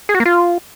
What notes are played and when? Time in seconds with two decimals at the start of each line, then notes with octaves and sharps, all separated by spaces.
0.09 G#4
0.14 F#4
0.20 A#3
0.25 F4